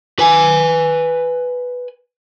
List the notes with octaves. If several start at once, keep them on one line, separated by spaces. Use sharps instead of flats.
B4 G#5